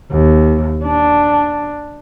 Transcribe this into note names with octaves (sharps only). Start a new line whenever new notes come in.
D#2
D4